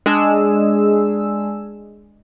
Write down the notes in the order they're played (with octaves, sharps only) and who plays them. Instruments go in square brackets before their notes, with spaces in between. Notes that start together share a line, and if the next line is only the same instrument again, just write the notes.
[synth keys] G#3 D4 G#4 E6